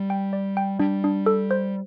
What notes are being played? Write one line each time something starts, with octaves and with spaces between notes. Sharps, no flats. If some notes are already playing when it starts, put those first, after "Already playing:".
Already playing: G3
G5
D5
G5
G3 D4
D4
A4
C5